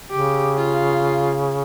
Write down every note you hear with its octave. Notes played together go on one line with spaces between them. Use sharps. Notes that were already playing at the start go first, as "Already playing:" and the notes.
C#3 G4
F4